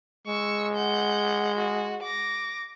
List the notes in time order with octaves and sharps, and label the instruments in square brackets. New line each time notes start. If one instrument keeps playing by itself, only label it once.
[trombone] G#3 [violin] C#6 E6
[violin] F#5 G6
F#4
D6 A#6